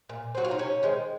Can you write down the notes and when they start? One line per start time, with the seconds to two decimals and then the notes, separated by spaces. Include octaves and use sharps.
0.09 A#2
0.35 F#3 C4 F#4
0.44 F4
0.51 D#4
0.59 C3 C#4
0.83 D#3 G#3 C4